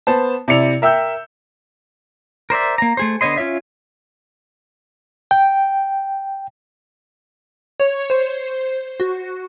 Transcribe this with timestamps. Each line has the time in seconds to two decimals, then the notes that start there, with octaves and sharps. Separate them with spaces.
0.07 B3 C5 A5
0.48 C3 E4 D5 C#7 F7
0.82 A#4 E5 G5 E6 G6
2.50 A#4 C5 D5 E5
2.78 A#3 A#5
2.97 A3 G#4 C5
3.21 D3 B3 C#5 D#5 C6
3.37 C#4 F4 C#5 E5
5.31 G5
7.80 C#5
8.10 C5
9.00 F#4